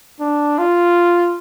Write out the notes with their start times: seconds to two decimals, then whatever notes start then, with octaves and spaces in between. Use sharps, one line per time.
0.20 D4
0.58 F4